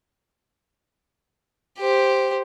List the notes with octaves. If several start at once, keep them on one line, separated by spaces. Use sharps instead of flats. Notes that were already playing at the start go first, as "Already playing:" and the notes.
G4 C5